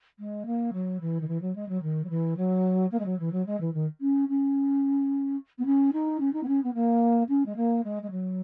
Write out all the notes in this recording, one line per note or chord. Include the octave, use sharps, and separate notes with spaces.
G#3
A#3
F#3
E3
D#3
E3
F#3
G#3
F#3
D#3
F#3
E3
F#3
A#3
G#3
F#3
E3
F#3
G#3
E3
D#3
C#4
C#4
B3
C#4
D#4
C#4
D#4
B3
C#4
B3
A#3
C#4
G#3
A#3
G#3
G#3
F#3